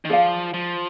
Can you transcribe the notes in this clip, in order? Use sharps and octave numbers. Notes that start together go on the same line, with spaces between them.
D#3
F3 G#4 D5 F5
F3